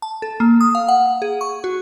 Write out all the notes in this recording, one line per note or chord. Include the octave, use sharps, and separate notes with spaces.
A5
A4
A#3
D#6
F5
F#5
G#4
C#6
F#4